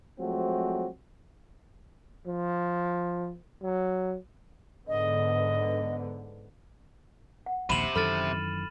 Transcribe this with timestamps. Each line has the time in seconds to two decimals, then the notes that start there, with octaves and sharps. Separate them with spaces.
0.20 F3 F#3 G#3 A3 C4 F#4
2.26 F3
3.62 F#3
4.88 G#2 D3 B3 D#5
7.46 F#5
7.70 A#1 D#2 C3 B5 C6 D#7 E7 F#7
7.95 F#2 D#3 E3 A4 B5 F6 A6